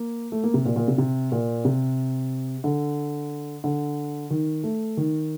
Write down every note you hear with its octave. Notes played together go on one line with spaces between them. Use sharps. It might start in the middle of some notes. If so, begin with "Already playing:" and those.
Already playing: A#3
A3
A#3
C3
A#2
A#2
C3
C3
A#2
C3
D3
D3
D#3
A3
D#3